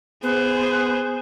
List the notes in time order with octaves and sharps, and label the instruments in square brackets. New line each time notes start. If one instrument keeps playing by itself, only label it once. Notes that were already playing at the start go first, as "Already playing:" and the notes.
[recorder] B3 [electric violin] G#4 C5